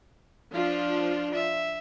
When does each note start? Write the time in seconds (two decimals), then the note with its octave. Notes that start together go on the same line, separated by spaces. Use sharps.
0.53 F3 D4 F4
1.34 E5